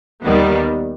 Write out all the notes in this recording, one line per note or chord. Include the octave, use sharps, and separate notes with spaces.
D#2 D#3 G3 B3